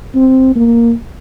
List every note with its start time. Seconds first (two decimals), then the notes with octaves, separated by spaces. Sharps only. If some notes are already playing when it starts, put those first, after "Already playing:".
0.15 C4
0.56 A#3